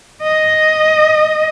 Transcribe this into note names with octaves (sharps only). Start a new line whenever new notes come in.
D#5